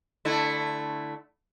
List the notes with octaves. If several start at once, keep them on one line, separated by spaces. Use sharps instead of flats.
D3 A3 E4